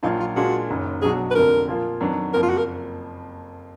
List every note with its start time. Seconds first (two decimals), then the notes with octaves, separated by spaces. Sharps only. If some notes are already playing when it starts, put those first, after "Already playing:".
0.03 A#1 A#2 F#3 D4 D#4 F4
0.20 F4
0.36 A#2 G#3 D4 F4 F#4 G#4
0.69 F#1 F#2 D#3
1.01 B1 B2 F#3 D4 F#4 G#4
1.31 B4
1.34 F1 F2 D3 F3 A#4
1.68 A#2 F3 A#3 F4
2.00 F2 D#3 F#3 B3 D4
2.33 F#1 F2 F3 A#3 A#4
2.42 F4
2.49 F#4
2.57 A#4